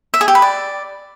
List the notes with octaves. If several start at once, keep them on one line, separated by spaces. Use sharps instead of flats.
E5
G#4
G4
B4
D5